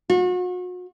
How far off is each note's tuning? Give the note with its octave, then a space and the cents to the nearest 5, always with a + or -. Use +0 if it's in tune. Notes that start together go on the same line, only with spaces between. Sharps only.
F#4 -40